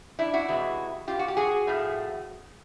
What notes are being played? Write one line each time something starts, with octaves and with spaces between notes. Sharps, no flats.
D4 E4
E4 F#4
C3 E3 G#3
F4 G4
F#4
G4
F#4 G#4
A2 F3 A3